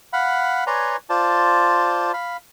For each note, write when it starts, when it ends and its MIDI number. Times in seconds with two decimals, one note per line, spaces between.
0.13 0.64 77
0.13 0.64 78
0.13 0.64 83
0.67 0.96 71
0.67 0.96 73
0.67 0.96 74
0.67 0.96 80
0.67 0.96 82
0.67 0.96 84
1.10 2.12 65
1.10 2.12 72
1.10 2.12 74
1.10 2.12 81
2.13 2.37 77
2.13 2.37 83